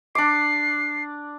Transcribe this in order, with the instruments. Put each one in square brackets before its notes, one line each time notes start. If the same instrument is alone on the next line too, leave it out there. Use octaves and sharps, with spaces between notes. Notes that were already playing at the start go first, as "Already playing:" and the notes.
[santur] D4 D6 [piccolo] C7